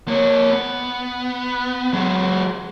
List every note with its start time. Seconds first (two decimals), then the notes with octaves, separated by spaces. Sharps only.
0.08 A#3 C#5
0.51 B3
1.93 F#3 G#3